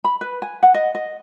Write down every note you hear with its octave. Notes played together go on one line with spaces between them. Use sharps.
B5
B4
G#5
F#5
D#5
D#5